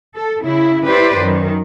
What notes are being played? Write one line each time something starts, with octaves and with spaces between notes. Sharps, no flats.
A4
C#3 E4
E4 G4 B4 C5 D5
F#2 D#3